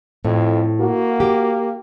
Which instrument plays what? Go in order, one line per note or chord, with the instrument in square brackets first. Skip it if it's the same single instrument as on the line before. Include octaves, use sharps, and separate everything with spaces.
[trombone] F2 [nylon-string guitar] A2
[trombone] A#3 [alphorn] F#4
[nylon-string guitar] G4